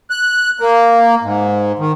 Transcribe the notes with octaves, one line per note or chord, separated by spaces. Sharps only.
F#6
A#3
G#2
D#3